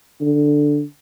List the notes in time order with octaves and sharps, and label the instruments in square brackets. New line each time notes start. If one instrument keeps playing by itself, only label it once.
[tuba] D3